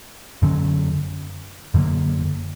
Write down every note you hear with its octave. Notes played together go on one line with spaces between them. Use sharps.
F#2 D3 F#3 C#4
F#2 D3 F#3 A#3